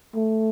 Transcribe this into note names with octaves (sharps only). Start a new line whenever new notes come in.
A3